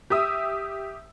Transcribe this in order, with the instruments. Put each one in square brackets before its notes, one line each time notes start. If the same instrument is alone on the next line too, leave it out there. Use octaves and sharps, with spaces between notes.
[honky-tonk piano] G4 E5 D#6 E6